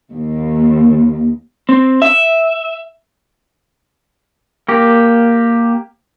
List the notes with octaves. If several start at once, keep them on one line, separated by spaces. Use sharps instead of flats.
D#2
C4
E5
A#3 G4